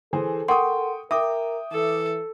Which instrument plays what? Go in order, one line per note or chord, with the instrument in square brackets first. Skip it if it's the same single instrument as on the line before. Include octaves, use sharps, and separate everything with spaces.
[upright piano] E3 G#4 C5 [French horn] A4
[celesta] A#4 F#5 C6 [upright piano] G5 C#6 D#6
[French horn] A#4 [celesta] E5 [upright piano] G5 D6 D#6
[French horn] E3 [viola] A4